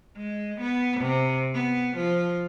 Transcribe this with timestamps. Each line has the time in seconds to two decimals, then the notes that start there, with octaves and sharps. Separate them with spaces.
0.17 G#3
0.60 B3
1.00 C3
1.54 B3
1.96 F3